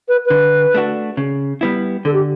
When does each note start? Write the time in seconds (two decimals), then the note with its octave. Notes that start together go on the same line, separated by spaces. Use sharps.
0.08 B4
0.26 D3 B4
0.74 A3 D4 F#4
1.17 C#3
1.61 G3 B3 E4
2.05 D3 A4
2.14 G4